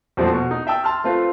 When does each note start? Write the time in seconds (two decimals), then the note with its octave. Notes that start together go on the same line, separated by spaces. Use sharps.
0.17 E2 A#2 F3 G#3 A3 C4
0.34 B2
0.51 D#4
0.67 E5 G5 A5 E6
0.84 A5 C6 F6
1.04 A3 C4 F4 B4